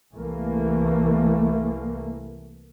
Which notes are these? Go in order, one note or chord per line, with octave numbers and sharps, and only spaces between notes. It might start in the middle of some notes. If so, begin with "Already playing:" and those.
C2 E3 A3 A#3